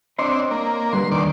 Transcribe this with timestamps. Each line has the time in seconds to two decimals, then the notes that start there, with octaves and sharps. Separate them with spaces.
0.19 C4 D4 C#5 D#5 C6
0.51 A#3
0.93 D3 G3 B4 C6
1.12 D#2 D5